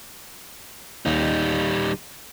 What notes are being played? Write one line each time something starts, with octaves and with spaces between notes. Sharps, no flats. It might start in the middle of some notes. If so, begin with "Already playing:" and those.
D#2 G3 D#4